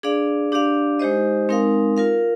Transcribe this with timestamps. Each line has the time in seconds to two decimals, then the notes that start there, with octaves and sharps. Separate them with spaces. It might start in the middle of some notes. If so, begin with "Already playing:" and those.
0.03 D4 G#4 D5 F5
0.52 D4 G4 D5 F5
0.99 G#3 D#4 G4 C5 D#5
1.49 G#3 C4 D#4 A#4 F5
1.97 F4 A#4 F5